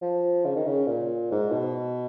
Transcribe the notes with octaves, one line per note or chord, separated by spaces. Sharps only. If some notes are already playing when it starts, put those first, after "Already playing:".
F3
C#3
D#3
C#3
A#2
G#2
B2